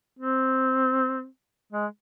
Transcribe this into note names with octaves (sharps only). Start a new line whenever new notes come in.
C4
G#3